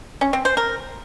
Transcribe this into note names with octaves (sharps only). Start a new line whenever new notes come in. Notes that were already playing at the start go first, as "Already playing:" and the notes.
C#4
C4
C5
A#4